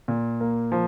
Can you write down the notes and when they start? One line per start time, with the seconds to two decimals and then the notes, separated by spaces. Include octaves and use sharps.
0.08 A#2
0.40 A#3
0.72 F3